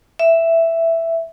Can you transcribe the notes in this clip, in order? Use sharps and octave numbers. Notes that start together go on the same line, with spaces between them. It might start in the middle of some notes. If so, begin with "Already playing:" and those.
E5